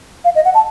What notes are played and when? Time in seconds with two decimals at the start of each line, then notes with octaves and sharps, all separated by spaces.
0.24 F5
0.35 D#5
0.45 F#5
0.54 A5